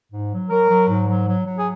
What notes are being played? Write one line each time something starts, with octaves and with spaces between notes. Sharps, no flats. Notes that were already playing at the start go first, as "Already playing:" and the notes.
G#2
F#3
F#3 A#4
F#3
G#2
F#3
F#3
F#3
G#4